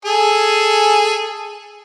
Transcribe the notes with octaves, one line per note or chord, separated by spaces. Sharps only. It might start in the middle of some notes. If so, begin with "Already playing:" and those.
G#4 A4 G#5